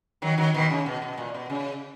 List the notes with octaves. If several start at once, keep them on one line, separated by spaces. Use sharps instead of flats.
D#3 F#3
D#3 F#3
B2 D#3
C#3
B2
B2
A#2
B2
C#3